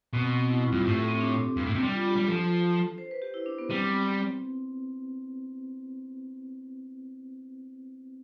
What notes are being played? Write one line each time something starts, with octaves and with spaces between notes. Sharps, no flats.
B2 C4
C4
E4
G2 F4
A2 G4
A4
C4
D4
G2
A2
C3
G3
F4
G4
G3
F3 A4
C5
B4
G4
E4
D4
B3
G3 C4